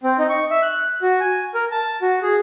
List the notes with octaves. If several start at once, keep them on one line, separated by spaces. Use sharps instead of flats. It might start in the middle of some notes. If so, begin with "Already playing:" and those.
C4
D#4
C#6
E5
F#6
F#4
G#5
A#4
A5
F#4
G#4